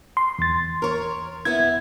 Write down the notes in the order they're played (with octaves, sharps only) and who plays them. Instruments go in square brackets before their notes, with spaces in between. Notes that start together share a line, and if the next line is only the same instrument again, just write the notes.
[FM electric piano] C6
[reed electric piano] E2 A6
[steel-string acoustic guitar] A#4 C#5
[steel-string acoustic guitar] B3 E4 [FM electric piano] G#6